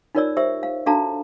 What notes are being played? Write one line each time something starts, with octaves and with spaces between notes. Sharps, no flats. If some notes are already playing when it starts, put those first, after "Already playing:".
D#4 F4 A#4 C#5 D5 E6
G4 C5 E5 E6
F5
D4 F#4 A4 F5 A5 A#5